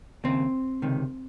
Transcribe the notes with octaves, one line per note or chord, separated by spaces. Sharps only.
D#2 C#3 C4
C#2 C3 D#3